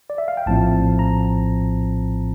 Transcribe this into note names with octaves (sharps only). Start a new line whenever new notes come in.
D5
E5
F5
G5
A#1 A2 F3 C4 A5
A#5